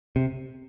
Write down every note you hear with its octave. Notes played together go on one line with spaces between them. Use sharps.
C3